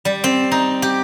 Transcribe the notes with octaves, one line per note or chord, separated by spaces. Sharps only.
G3
C4
D#4
G4